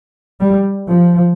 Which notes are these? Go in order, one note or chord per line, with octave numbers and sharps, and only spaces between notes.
G3
F3